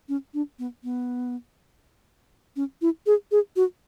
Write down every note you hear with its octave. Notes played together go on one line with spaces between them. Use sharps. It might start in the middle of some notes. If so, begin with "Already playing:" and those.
C#4
D4
B3
B3
C#4
E4
G#4
G#4
F#4